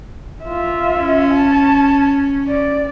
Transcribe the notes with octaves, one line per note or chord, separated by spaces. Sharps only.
F4 E5
C#4
A5
D5